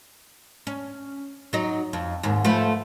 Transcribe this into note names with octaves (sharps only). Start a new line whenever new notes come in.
C#4
F#3 D#4
F2
D#2 G#2
F3 A3 B4